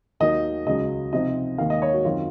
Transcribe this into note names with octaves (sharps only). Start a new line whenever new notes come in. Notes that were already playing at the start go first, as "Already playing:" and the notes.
D#2 D#3 F#3 A#3 D#4 D#5
C#2 C#3 F#3 D#5
C3 F3 C4 D#4 D#5
D#2 D#3 A#3 F5
D#5
C#5
F#4
F#2 D#3 F#3 C4 F4